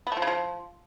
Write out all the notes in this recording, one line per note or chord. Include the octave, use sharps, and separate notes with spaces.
B3
A3
F3
C#3
F3